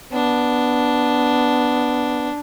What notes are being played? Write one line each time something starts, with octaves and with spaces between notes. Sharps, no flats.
B3 D4